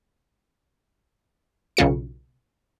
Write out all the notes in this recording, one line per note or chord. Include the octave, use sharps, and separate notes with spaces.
B1 C#3 F4 C#7